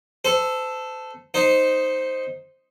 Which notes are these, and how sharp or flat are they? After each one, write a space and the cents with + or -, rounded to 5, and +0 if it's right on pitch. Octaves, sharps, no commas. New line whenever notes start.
A4 +0 C5 -35
D#4 +0 C5 +0